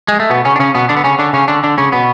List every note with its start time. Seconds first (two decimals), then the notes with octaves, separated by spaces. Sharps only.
0.08 G#3
0.20 A3
0.30 B2 B3
0.45 C#3 C#4
0.56 D4
0.59 C#3 C#4
0.75 B2 B3
0.89 D3 D4
0.97 B3
1.04 C#3 C#4
1.19 D3 D4
1.33 C#3 C#4
1.48 D3 D4
1.64 D3 D4
1.78 C#3 C#4
1.92 B2 B3